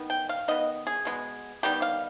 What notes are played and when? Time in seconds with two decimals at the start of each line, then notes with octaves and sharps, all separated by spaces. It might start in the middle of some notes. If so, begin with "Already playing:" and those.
Already playing: D#3 B3
0.10 G5
0.29 F5
0.48 D#3 B3 D#5
0.87 G#4
1.05 B2 G#3 B3
1.63 D#3 G3 B3 G4
1.82 F5